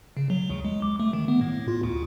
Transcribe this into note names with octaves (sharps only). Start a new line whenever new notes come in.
C#3
F#3
D2
G#3
D6
A3
D#3
B3
A2
F4
D2